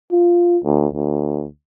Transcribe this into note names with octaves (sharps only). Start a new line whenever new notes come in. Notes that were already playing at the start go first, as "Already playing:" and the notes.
F4
D2
D2